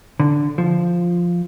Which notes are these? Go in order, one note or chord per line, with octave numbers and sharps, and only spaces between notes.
D3
F3